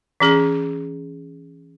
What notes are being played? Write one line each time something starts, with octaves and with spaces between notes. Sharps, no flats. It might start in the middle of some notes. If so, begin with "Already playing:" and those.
E3 C#4 G#4